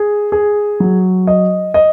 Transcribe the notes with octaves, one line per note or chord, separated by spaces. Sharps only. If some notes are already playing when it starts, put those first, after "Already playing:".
Already playing: G#4
G#4
F#3
D#5
D#5